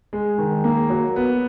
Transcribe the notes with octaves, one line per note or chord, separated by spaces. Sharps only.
G#3
D#3
A#3
F#3
B3